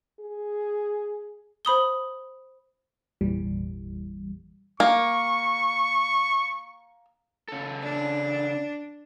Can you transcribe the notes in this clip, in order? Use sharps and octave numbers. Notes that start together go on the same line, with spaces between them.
G#4
C5 B5 D#6 G7
G#1 E2 A#2 E3 G3
A#3 C#6
C#3 A4
D4